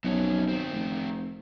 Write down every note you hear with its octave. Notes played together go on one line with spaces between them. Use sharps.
B1 F2 C#4
D#3 C4
F1